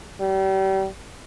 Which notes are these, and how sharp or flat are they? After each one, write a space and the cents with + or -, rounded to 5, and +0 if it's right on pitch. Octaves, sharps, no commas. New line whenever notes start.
G3 -35